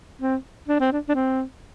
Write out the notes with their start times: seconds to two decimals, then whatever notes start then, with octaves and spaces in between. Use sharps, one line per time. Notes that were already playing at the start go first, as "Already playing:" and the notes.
0.22 C4
0.68 D4
0.80 C4
0.92 D4
1.09 D4
1.15 C4